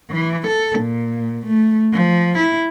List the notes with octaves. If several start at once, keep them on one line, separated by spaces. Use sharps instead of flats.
E3
A4
A#2
A3
F3
E4